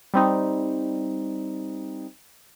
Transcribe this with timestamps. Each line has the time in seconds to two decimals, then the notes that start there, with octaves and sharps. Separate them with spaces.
0.14 G3 C4 D#4